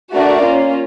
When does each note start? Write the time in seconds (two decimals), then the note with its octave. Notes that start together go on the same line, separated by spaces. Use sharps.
0.13 A3 D4 F#4 A#4 D5
0.43 A#3 C#4 F4